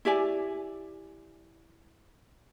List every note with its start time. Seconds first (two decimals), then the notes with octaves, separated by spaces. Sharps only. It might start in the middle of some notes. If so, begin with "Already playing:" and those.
0.05 E4 G4 D5 G#5